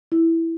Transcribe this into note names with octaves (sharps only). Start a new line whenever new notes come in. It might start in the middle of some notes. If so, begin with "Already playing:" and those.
E4